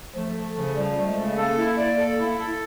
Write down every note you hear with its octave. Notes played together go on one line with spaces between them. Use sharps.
F3 A3
A3
C#3
F3 G3
A3
G#3
C#3
A#3 A4
E4
D5
A4
E4
A4